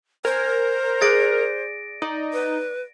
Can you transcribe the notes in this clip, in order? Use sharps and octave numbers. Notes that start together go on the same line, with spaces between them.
A#4 C5 G#5
G#4 D5 F#6 A6 A#6 D7
D#4 D5
B4